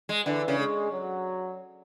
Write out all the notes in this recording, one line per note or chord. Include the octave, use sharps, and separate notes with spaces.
G#3
D3 E3
C#3
G#3
F#3